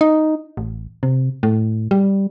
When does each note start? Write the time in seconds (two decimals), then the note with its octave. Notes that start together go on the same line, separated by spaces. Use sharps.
0.01 D#4
0.57 A1
1.03 C3
1.43 A2
1.91 G3